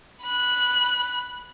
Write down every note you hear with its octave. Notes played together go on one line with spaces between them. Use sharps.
B5 F#6